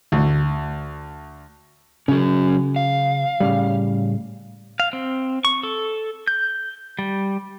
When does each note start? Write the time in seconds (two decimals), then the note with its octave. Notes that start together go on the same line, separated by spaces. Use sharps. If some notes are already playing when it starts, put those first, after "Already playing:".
0.12 D2
2.08 C#3 F#3 C#4
2.76 F5
3.40 A2 C#3 G3
4.80 F5
4.93 C4
5.45 C#6
5.63 A4
6.28 G6
6.99 G3